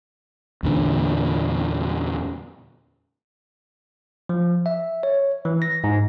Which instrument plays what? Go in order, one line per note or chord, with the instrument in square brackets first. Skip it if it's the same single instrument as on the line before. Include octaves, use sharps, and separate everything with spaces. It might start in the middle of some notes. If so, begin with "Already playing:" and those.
[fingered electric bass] E2 A#2 D3
[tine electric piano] F3
E5
C#5
E3
A#6
G#2